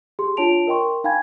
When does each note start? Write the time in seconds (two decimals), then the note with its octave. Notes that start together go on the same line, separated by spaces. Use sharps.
0.19 G4 G#4 C6
0.37 D4 F4 C#5 A5 D7 F7
0.67 A#4 D#5 G5 C6 C#6
1.04 D#4 F5 G5 G#5 B5 G#6